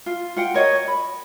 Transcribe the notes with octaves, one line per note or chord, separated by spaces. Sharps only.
F4
F4 F#5 G5
A#4 C#5 D#5
B5